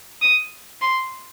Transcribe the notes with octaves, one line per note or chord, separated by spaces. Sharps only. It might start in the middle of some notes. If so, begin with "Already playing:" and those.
D#6
C6